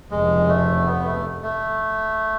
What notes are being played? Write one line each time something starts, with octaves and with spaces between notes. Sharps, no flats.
F1 F2 C#3 F3 G#3
A3
B3
A3
A3